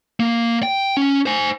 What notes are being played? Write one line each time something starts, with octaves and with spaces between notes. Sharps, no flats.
A#3
G5
C#4
C5 G#5